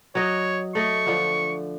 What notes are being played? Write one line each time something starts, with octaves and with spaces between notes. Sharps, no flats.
F#3 C#5 D#5
A3 D#5 C#6
D3 F3